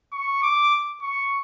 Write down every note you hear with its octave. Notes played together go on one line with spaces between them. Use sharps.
C#6
D6
C#6